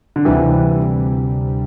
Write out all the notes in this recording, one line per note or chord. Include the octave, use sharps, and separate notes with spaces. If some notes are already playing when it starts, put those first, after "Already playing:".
D3
D2 C3 E3 G3